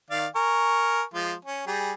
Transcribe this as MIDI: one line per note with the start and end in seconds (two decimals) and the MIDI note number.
0.10 0.27 51
0.10 0.27 74
0.10 0.27 77
0.36 1.03 70
0.36 1.03 80
0.36 1.03 85
1.14 1.34 53
1.14 1.34 56
1.14 1.34 65
1.45 1.66 61
1.67 1.92 55
1.67 1.92 68